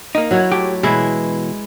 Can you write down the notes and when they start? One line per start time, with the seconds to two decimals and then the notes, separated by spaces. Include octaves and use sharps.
0.15 A#3 D#4
0.31 F#3 E4 C#5
0.52 A3 G4
0.83 B2 E3 G#3 B3 E4